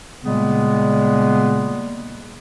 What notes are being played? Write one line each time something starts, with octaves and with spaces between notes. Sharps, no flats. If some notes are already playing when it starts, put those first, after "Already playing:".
A#2 C#3 G3 G#3 A#3 B3